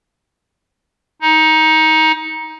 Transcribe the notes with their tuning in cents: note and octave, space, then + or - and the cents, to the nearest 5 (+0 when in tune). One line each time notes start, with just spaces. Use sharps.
D#4 +20